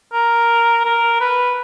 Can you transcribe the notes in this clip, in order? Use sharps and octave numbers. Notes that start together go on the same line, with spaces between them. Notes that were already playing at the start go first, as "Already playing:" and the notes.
A#4
A#4
B4